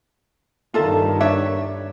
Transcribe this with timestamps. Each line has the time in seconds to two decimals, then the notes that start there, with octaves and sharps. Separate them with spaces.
0.74 G2 D#3 F4 A4 E5
1.20 D4 C#5 E5